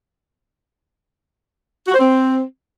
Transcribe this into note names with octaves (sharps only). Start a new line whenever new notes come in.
F#4
C5
C4